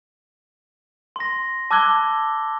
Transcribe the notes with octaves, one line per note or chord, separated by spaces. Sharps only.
C6 A#6
A5 D6 E6 F#6 G#6 G7